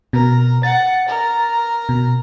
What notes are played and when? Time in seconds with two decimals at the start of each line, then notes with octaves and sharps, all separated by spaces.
0.13 B2 A#4
0.63 F#5 A6
1.08 A#4
1.89 B2